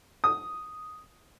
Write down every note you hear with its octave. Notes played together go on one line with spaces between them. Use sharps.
D#6